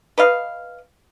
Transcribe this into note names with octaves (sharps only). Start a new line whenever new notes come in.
B4 D#5 F5